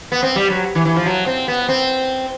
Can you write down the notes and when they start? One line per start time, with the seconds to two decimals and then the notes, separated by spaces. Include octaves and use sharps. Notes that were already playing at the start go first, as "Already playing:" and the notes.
0.12 B3
0.23 C4
0.36 G3
0.50 F#3
0.75 E3
0.85 E3
0.96 F3
1.06 F#3
1.26 C4
1.48 B3
1.69 C4